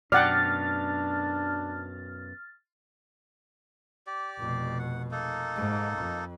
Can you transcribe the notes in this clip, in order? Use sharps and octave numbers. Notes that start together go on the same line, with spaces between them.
F#2 B2 D4 D5 F#5 G5 F6 A6
G4 D5
F1 B2
F#5
A#3 D#4 A4
G#2
F2